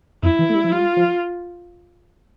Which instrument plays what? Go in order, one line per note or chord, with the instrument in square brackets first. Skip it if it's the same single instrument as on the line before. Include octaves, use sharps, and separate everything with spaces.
[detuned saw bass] F2 [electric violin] E4
[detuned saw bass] E3
A3
G3
F3
[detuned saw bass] G3 [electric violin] F4
[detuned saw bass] F3